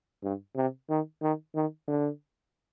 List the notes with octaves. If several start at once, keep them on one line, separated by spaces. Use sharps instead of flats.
G2
C3
D#3
D#3
D#3
D3